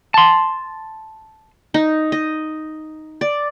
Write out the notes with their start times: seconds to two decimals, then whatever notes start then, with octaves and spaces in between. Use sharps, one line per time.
0.14 A5 C6
1.74 D#4
2.12 D#5
3.21 D5